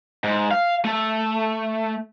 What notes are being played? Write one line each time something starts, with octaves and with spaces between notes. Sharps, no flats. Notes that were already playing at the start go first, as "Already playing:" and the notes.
G#2
F5
A3